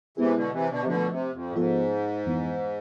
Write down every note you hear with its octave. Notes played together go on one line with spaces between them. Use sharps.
C3 E3 G#3 B3 E4 G#4
B2 D3
C3 E3
B2 D3
C3
B2 D3 F3 A3 D4
C3
F2
A2
G#2 F3 B3 F4 A4
F2 E3 B3